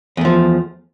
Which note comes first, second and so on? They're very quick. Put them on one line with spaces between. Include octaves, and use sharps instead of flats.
E2 A3 F3